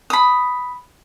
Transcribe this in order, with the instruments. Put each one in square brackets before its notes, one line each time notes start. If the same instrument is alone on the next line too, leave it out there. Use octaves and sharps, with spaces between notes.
[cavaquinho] B5 D#6